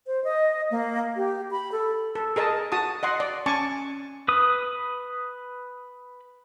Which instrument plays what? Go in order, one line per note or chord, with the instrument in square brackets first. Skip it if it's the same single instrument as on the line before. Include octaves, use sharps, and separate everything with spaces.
[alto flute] C5
D#5
A#3
G4
B5
A4
[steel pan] A4
G#4 A#4 D#5 A5
F#4 A5 D#6
D#5 F#5 C6
D5
C#4 G#5 A5 C#6 D6
[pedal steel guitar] B4 D#6